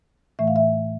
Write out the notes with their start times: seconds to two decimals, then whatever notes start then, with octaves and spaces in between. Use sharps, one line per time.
0.39 A2 E3 A3 E5
0.47 F5
0.56 E5